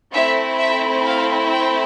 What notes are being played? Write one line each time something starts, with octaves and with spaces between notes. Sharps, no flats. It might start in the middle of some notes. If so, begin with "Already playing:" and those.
A3 C4 E4 E5
E5
F5
G5